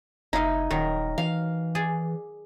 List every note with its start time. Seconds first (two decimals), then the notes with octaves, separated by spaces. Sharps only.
0.33 F#1 D#4 E4 F5
0.71 D#1 D#3 F#3 A#4
1.18 E3 F5
1.75 G#4 D5